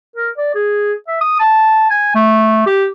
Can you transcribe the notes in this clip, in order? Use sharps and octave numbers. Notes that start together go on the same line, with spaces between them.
A#4
D5
G#4
E5
D#6
A5
G#5
A3
G4